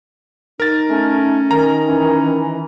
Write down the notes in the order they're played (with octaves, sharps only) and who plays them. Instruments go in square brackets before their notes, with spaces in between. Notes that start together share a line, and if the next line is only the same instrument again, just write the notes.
[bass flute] D#4 [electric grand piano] A#4 A6
[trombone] A3 [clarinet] C#4
[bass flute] D#3 [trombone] A#4 [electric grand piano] A#5
[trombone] E3 [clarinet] C#4